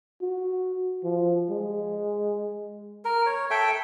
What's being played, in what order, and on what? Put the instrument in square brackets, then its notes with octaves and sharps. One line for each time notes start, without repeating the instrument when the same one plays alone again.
[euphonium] F#4
F3
G#3
[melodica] A#4
C#5
A4 E5 G5